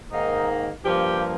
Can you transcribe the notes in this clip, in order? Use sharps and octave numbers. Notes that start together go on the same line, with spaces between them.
G#2 D#3 A#3 D#4
G2 F3 A#3 G4